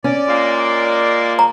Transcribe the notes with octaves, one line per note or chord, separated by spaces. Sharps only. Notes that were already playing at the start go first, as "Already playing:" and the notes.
C#4 D5
A#2 G#3 A#3
A#5